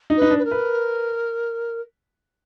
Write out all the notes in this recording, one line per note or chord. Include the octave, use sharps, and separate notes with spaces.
D#4
B4
D#4
D4
B4
A#4
B4